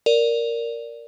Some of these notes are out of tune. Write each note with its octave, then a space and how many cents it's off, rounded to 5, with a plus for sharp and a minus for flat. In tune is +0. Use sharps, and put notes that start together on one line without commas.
A#4 -5 D5 -10